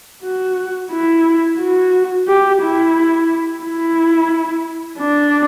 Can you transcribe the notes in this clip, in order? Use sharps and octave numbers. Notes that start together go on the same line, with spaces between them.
F#4
E4
F#4
G4
E4
E4
D4